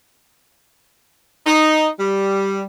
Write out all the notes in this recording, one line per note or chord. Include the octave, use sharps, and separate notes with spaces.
D#4
G3